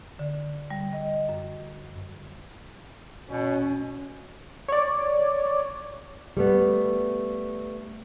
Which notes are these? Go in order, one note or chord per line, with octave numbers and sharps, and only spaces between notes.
D3
G3
D#5
F#2
B2 C#4
C#5 D5
G3 A3 B3